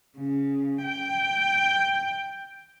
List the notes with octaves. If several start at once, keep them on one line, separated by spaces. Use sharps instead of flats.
C#3
G5